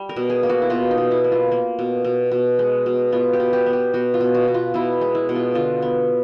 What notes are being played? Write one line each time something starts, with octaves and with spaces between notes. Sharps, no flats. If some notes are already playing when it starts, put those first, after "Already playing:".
Already playing: G3
A#4
B2
G#4
A#3
F#4
E4
B2 F4
D#4
B2
E4
A#3
F4
A#3
B2
B2
B2
G#3
B2
B3 F4
G4
B2
G4
B3
G4
B2 F#4
F4
B2
F#4
B2
F4
B2 E4
G#3
E4
B2
F4
D3 F4
B3